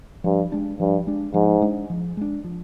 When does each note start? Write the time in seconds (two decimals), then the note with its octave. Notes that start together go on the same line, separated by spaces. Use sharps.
0.24 G2 F3
0.52 G#3 D4
0.80 G2 F3
1.07 G#3 D4
1.34 G#2 F3
1.62 G#3 D4
1.90 F3
2.17 G#3 D4
2.44 F3